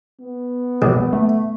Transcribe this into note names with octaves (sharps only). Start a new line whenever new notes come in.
B3
A#1
A3